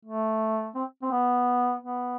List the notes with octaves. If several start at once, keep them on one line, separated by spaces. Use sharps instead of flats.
A3
C4
C4
B3
B3